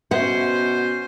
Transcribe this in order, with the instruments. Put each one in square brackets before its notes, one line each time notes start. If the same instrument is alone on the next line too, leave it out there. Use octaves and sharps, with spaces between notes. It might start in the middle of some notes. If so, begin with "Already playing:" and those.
[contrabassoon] B2 [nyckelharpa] C#4 C5 [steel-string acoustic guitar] F#5